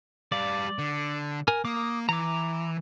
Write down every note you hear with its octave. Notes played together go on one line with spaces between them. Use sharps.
G3 D5 F5
D3
A#4 G#5
A#3 D6 D#6
E3 A#5 D6